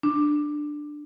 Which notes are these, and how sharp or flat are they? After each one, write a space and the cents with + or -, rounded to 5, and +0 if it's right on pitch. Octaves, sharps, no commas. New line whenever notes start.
D4 +10